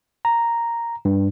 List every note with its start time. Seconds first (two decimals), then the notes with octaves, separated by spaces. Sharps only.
0.25 A#5
1.05 G2